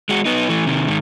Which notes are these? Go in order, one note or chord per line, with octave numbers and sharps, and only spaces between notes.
G#3 F#4
B3 D#4
E3 A3
C3 D#3
G#2 D#3